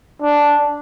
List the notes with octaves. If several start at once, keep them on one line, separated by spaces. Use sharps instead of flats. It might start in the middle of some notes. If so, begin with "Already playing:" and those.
D4